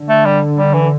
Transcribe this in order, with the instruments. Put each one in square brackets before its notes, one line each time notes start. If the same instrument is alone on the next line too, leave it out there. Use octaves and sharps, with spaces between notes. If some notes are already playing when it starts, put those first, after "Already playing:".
Already playing: [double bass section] D3
[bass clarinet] A3
G3
G3
E3